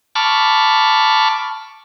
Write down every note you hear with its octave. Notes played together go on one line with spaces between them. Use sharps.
A5 B5 C#6 D6 F6